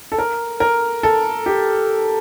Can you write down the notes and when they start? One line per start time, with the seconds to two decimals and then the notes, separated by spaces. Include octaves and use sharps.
0.12 A4
0.18 A#4
0.60 A#4
1.03 A4
1.46 G4